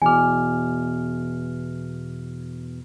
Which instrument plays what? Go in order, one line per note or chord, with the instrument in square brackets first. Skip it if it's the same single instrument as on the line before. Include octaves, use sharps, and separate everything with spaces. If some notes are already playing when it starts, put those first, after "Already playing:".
[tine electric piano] E2 B2 F6 [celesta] G#5 D6